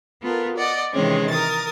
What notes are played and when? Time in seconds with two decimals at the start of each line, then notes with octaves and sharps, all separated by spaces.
0.22 B3 F4 A4 A#4
0.56 D5 D#5 F#5
0.92 C3 D#3 E3 G#3 C4 C#4
1.30 A#4 D#6 A6